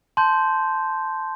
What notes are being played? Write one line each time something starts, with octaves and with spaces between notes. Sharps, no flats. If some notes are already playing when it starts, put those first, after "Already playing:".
A5 C6 G6